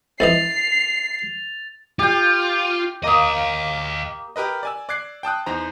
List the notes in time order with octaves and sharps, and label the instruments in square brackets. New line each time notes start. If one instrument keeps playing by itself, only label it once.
[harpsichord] F2 E3 D#5 [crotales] A6 F7 [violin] C7
[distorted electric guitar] F4 [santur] G4 G5
[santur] A#3 D#6 [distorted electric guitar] D#5 F5
[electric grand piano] G4 A#4 B4 D#5
D5 G#5 E6
D5 D6 F#6 G#6 C7
G5 A5 D#6 F#6
E2 D#4 C5 A#5